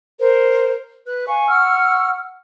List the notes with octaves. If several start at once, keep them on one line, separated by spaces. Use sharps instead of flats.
A#4 C5
B4 F#6
F5 G#5 C#6
F#5 C#6 E6 F6